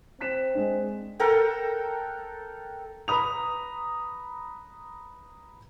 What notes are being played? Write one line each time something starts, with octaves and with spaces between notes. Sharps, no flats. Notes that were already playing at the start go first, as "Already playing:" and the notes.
C4 F#6 B6 E7
G#3 D4
A4 A#4 F#5 G5
B4 A#5 B5 D#6 F7